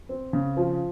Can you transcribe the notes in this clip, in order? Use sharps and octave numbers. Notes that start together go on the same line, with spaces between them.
C4
C#3
F3